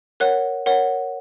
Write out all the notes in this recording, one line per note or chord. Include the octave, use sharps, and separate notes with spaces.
A#4 C#5 F#5 F#6
A#4 C#5 F#5